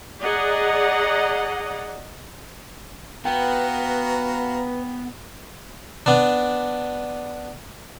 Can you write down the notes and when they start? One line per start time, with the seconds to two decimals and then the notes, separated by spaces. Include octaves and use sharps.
0.21 G#4 D5 D#5 F#5 A#5
3.25 B3 F#4 B4 F5 G5 A#5
6.06 B3 D4